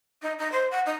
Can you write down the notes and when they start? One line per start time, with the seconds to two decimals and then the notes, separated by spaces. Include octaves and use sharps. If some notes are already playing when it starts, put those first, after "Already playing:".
0.22 D#4
0.39 D#4
0.52 C5
0.71 F#5
0.86 D#4